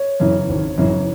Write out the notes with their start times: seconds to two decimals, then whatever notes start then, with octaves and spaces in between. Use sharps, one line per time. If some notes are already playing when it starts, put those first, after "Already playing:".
Already playing: C#5
0.20 F#2 C#3 E3
0.49 G#1
0.78 F#2 C#3 E3